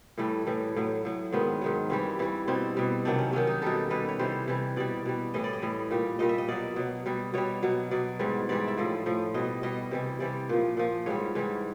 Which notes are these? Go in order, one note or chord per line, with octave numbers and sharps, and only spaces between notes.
A2 E3 G3 A3
A2 E3 G3
A2 F#3
A2 F#3
G#2 D#3 F#3 B3
G#2 D#3 F#3
G2 E3 G3 C4
G2 E3 G3
B2 G3 C4
B2 G3
C3 D#3 F#3 D4
C#4
C3 D#3 F#3 C#4
D#4
B2 G3 A4
B2 G3 B4
C#5
C3 E3 G3 C5
C3 E3 G3
B2 G3 D5
B2 G3
A2 E3 G3 D#5
D5
D#5
A2 E3 G3
A#2 G3
A#2 G3 D#5
E5
D#5
B2 F#3 D5
B2 F#3
B2 G3
B2 G3 C#5
B2 F#3
B2 F#3 D5
G#2 E3 G3
G#2 E3 G3 D5
E5
A2 F3
A2 F3
B2 G3 D#5
B2 G3 D#5
C3 E3 G3
C3 E3 G3 D5
A#2 F3
A#2 F3
G#2 E3 G3 C#5
G#2 E3 G3